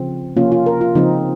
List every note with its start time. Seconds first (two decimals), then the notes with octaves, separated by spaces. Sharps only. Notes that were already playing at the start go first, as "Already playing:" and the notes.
Already playing: C#3 F3 C4
0.36 C3 F3 A#3 C#4 F4
0.52 F4
0.66 A#4
0.81 F4
0.95 C#3 F3 C4 D#4